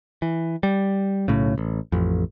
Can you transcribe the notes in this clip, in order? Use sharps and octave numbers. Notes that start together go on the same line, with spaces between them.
E3
G3
B1 A2 C#3
A1
A1 F2